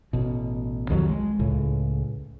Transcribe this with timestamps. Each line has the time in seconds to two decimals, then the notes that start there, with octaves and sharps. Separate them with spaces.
0.13 A1 B2
0.90 C2 F2 D#3 F#3
1.09 G#3
1.39 C#2 A2 C#3